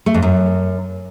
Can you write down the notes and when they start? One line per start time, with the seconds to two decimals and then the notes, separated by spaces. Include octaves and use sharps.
0.06 A3
0.14 F2
0.22 F#2